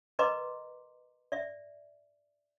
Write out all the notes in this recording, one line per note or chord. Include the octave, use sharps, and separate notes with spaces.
A#4 B4 D#5 A#5 C6 D6
D5 E5